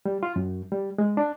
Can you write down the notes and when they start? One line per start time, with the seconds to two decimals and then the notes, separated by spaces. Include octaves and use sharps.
0.06 G3
0.23 F4
0.36 F#2
0.72 G3
0.98 G#3
1.17 D4